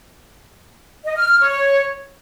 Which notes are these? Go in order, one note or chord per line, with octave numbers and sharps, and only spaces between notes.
D#5
F6
F6
C#5